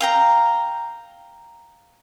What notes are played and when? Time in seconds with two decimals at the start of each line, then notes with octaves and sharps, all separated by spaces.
0.01 F5 G5 A#5